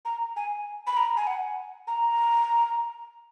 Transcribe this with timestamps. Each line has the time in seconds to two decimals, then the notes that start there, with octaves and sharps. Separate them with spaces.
0.05 A#5
0.36 G#5
0.87 B5
0.97 A#5
1.17 G#5
1.27 F#5
1.87 A#5